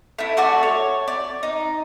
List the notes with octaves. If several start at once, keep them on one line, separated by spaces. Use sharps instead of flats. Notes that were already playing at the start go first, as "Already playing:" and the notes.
A3 E4
A3 F#4 A4 D5
C#5
D5
D#4